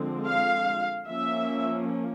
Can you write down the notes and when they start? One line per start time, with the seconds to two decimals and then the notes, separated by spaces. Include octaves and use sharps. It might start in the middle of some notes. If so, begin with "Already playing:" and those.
Already playing: D3 F3 G#3 C4
0.29 F5
1.08 F3 A#3 C#4 E5